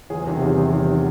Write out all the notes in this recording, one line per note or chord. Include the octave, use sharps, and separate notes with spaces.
E2 G#4
C3 D#3 G3 G4
E2 G#4
C3 D#3 G3
E2
C3 D#3 G3